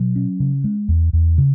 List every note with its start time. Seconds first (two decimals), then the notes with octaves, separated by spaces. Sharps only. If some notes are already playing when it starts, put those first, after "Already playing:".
Already playing: B2 F#3
0.16 C#4
0.40 C#3
0.64 G#3
0.88 E2
1.13 E2
1.38 C#3